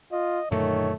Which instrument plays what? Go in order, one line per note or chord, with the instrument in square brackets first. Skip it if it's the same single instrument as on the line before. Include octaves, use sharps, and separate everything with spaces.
[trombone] F4 [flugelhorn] D#5
[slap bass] F#2 A#2 D3 [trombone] D#3 [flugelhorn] A3 [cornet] C#5